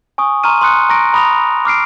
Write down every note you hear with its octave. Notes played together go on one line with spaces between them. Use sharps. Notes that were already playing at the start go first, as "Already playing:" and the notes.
G#5 C#6 D#6
A#5 C6 C#6 F6 D#7
C6 D#6 F#6 C#7
A#5 C#6 A#6 D7
A#5 B5 D#6 A#6 F7
D6 F6 C7 D7